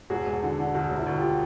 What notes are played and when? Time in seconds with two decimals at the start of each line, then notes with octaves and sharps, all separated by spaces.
0.10 E1 F#4 G#4
0.26 E1
0.43 D3
0.59 D3
0.74 D2 F#4 G#4
0.90 E1
0.96 E4 F#4
1.06 D2
1.17 F4 G4